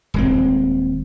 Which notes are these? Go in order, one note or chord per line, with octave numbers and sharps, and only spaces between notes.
D#1 G#3 C4